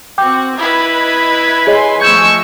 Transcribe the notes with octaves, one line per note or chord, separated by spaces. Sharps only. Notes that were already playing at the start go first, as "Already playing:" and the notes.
C4 F#4 G5 D6 G6
E4 B4 D#5 G#6
G#4 C#5 D#5 G#5 C6
F3 G#3 A3 C#6 E6 G6 G#6